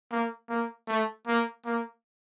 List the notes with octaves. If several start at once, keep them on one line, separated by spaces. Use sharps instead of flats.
A#3
A#3
A3
A#3
A#3